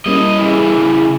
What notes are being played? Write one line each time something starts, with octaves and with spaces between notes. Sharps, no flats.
G3 A#3 C#4 E4 D#5
C#3 E3